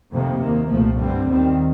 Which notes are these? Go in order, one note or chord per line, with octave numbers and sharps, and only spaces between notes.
F2 C3 D#3 A#3
D#2 D#3 A#3
C2 A#2 F3 A3
G2 D3 G3 C4
D#2 D#3 G3 C4